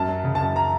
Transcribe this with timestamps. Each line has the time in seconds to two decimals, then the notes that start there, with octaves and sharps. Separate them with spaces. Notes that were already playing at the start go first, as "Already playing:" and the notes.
Already playing: F#2 A5
0.08 F#3
0.24 C#3
0.35 A5
0.41 F#2
0.56 A#5